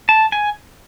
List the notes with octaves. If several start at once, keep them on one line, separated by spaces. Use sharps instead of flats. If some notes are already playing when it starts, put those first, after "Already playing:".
A5
G#5